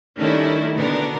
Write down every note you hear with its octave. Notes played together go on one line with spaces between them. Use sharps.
D#3 G3 A3 C#4 D4 E4
B2 D3 B3 C4 D4 A#4